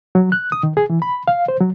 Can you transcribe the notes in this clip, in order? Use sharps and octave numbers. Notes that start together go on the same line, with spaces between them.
F#3
F#6
D#6
D#3
G#4
E3
B5
F5
C5
F#3